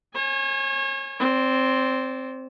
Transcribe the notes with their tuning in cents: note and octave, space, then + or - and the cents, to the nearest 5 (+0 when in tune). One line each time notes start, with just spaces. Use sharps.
C#5 -35 G#5 +0
C4 +0 D5 -35